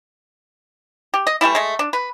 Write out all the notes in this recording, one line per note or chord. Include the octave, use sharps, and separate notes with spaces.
G4
D#5
E3 G3 A3 E4
G#3 A3
D4
B4